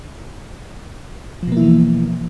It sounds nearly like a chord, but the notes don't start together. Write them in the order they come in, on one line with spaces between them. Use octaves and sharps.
F3 B2 A#3 E4 E3